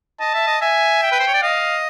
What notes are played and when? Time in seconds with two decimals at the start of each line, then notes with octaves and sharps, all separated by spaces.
0.20 D#5 A5
0.34 E5
0.47 D#5
0.61 E5 G#5
1.02 G5
1.12 B4
1.19 C5
1.28 C#5
1.34 D5
1.42 D#5 F5